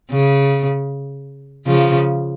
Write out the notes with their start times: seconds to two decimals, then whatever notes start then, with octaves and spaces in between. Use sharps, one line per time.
0.11 C#3
1.67 C#3 F3